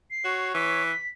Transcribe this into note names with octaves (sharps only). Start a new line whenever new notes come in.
C7
F#4 C#5
E3 B6